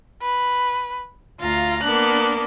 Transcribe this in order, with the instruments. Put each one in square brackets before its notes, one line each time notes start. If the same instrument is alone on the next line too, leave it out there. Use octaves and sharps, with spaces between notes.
[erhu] B4
[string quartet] D2 F5 A#5 [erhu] F4
[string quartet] A#3 B3 D4 [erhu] F#6